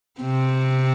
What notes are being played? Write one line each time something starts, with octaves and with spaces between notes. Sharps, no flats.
C3 C4